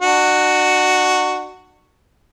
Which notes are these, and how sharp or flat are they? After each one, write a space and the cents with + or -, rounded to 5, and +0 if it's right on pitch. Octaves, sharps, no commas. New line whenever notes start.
D4 +40 F#4 +0